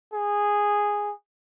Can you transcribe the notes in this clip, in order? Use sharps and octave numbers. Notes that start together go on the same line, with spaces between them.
G#4